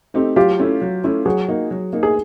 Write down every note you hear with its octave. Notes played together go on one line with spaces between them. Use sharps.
A3 C4 D#4 G4
F#3 F4 G4
A3 C#4 E4
F#3
A3 C#4 E4
F#3 F#4 G#4
A#3 D#4
F#3
A#3 D#4
G#4